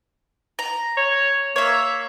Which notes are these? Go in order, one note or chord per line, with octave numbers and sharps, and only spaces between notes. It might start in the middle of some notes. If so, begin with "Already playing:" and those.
A#5
C#5
A#3 C#5 E5